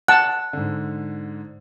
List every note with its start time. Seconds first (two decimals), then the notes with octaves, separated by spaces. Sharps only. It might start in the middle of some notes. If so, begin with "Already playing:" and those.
0.08 F#5 A5 F#6
0.53 G#2 D3